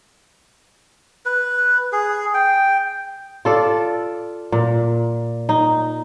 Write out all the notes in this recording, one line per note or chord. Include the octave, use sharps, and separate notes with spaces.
B4
G#4
G5
F4 A4 D5
A#2
D#4